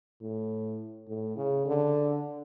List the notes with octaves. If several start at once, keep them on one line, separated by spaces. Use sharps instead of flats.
A2
A2
C#3
D3